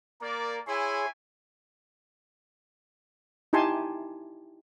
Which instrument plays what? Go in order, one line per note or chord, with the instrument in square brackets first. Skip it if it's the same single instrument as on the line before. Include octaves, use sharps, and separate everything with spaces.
[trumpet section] A#3 D5 [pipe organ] A#4
[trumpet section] E4 G#5 [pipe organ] G#4 C#5 C6
[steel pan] D#4 E4 G4 G#5 A5 C6